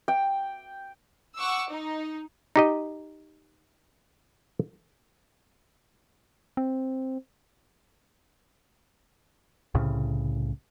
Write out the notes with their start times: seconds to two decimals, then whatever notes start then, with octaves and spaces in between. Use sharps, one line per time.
0.08 G5
1.37 F#5 C#6 D6 E6
1.70 D#4
2.56 D#4 G4 D#5
6.57 C4
9.75 C2 A2 C#3